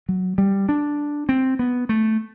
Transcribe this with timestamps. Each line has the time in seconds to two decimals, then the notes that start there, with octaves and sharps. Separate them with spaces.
0.09 F#3
0.38 G3
0.69 D4
1.29 C4
1.59 B3
1.89 A3